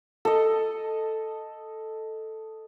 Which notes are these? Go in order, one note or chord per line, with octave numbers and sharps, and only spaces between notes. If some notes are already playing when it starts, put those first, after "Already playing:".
A4 D#5